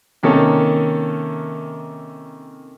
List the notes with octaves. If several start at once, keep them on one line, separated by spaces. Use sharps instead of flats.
C3 D#3 A#3 C#4 A4